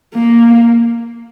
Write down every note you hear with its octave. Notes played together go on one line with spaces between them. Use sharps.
A#3